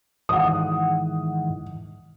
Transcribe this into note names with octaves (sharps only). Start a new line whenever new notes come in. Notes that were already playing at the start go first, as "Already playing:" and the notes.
G#2 D#3 E3 F#5 D#6